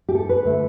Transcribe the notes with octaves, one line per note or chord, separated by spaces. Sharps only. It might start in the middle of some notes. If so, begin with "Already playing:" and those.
G4
A4
B4
D3 A3